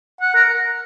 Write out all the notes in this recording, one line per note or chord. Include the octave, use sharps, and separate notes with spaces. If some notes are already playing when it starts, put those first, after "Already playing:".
F#5
A#4